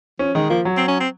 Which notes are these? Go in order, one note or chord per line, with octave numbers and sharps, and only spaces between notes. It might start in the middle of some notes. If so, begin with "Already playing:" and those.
F3 C#4
D#3 G#3
F3 A#3
F#3
C4
C#4
C4